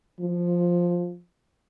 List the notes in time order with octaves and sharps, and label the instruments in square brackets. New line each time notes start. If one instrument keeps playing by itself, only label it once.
[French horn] F3